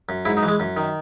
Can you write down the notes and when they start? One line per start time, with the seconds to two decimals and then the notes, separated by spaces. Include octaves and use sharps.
0.09 F#2
0.25 G#2 E4
0.37 D#4
0.43 E3
0.48 G#3
0.60 F#2
0.77 D#3